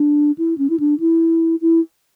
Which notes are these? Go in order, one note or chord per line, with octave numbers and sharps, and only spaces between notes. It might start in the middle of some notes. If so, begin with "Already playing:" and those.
Already playing: D4
E4
C#4
E4
D4
E4
E4